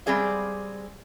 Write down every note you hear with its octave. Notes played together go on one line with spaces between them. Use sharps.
G3 G#3 C4 G#4 D5 F5